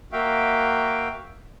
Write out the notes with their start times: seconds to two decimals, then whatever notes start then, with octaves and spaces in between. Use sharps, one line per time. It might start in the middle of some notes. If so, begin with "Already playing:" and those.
0.13 A#3 F#4 E5 F5 G5